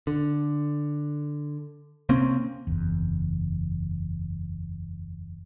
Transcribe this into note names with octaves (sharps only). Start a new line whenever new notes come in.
D3
C3 A#3 C4 C#4
F#1 E2